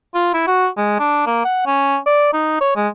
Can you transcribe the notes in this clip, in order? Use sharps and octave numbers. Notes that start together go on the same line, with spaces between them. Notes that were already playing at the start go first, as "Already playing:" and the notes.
F4
E4
F#4
G#3
D4
A#3
F#5
C#4
D5
D#4
C#5
G#3